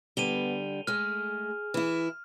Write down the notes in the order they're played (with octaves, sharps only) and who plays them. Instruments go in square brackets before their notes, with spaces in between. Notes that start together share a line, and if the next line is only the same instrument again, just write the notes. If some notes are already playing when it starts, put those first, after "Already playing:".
[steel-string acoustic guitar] D3 G3 [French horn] B3 [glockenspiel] D#7 F7 G7
[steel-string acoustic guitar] G#3 A3 [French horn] G#4 [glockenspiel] F6
[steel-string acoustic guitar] E3 E4